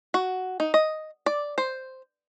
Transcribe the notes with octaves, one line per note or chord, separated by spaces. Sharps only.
F#4
D#4
D#5
D5
C5